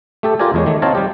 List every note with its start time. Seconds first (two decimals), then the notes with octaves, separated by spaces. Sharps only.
0.23 A3 G4 A4
0.39 F4 G4 A#4 D5 G#5
0.54 E2 G#3 C#5
0.66 D#3 A3
0.82 C4 D#4 C#5 F5 A5 A#5
0.95 G3 G4